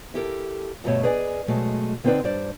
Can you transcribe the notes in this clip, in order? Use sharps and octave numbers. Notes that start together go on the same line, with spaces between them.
E4 G4 A4 A#4
D2 G2 B2 A3 C#5 A5
G#4 B4 D5 D#5 G#5
B2 F#3 G#3 A3
D3 B3 C4 D#4 B4 D5
G2 G3 C5 D5